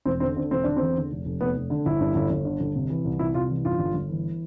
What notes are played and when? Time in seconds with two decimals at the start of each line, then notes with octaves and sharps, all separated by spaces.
0.05 E1 C4
0.20 D3 C4
0.36 D3 C4
0.51 E1 C4
0.64 D3 D4
0.76 E2 C4
0.96 D3
1.11 F1
1.25 F1
1.41 F1 B3
1.56 F1
1.70 D3
1.86 G1 E4
2.01 G2
2.15 G1
2.30 G1
2.45 D3
2.60 G1
2.76 C3
2.90 E3
3.05 C2
3.19 C3 E4
3.34 C2 F4
3.49 E3
3.65 G2 F4
3.79 G1
3.94 G1
4.09 E3